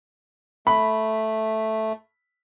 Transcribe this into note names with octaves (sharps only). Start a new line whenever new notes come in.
A3 B5